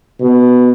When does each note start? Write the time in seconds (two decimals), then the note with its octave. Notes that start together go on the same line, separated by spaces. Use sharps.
0.20 B2